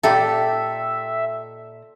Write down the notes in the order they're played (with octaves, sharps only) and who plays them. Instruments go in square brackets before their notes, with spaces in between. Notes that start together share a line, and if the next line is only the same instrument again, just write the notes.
[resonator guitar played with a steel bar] A#2 D#4 G4 [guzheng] A4 [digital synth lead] E5